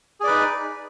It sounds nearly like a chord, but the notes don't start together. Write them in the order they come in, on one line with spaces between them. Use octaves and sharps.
G#4 D5 B4 D#4